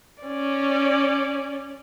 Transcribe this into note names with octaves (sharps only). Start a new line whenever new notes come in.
C#4 D5